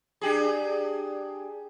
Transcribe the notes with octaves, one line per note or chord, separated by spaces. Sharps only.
D4 G4 G#4